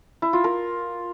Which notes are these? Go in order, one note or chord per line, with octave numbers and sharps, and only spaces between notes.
E4
F4
A#4